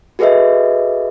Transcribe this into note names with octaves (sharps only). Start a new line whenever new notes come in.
F#4 G#4 A4 B4 D#5 E5